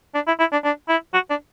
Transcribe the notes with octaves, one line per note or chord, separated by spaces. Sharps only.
D4
E4
E4
D4
D4
E4
F#4
D4